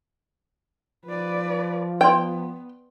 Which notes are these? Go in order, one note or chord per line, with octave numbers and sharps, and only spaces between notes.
F3 B4 D5
B3 B4 D5 G5 C6